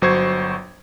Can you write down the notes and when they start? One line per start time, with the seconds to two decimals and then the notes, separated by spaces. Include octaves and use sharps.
0.02 G1 F#3 C5 C#6 G#6